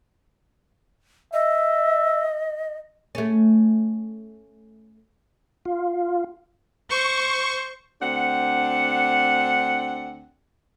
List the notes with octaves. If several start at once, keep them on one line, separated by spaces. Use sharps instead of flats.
D#5 E5
A3 C#4
F4
C5 C#6
D2 C4 D4 F#5